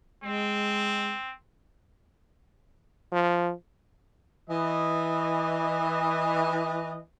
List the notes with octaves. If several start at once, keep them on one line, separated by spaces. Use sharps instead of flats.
G#3 C4
F3
E3 D#5